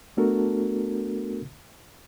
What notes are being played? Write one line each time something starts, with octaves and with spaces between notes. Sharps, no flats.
A3 B3 D4 F#4 A4 A#4